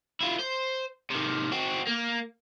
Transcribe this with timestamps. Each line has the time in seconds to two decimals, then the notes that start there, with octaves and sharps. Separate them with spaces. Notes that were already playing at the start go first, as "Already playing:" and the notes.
0.21 E4 F4
0.39 C5
1.10 C3 D#3
1.52 C4 F#4
1.87 A#3